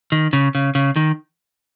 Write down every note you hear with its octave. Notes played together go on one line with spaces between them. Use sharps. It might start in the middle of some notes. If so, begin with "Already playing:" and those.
D#3
C#3
C#3
C#3
D#3